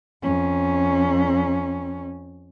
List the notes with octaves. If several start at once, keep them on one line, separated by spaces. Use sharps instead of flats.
F2 C#4